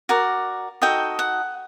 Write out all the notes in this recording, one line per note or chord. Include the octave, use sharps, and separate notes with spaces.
F#4 A#4 D5
D#4 F#4 A4 D#5 G5
F#5